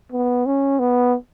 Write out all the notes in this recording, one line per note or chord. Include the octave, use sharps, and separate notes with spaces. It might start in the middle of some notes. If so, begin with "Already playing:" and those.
B3
C#4
B3